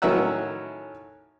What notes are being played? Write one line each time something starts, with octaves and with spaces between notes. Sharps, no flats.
A2 D#3 F#3 C#4 E5 F#5